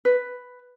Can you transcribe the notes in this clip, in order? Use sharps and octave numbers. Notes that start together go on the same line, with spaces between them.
B4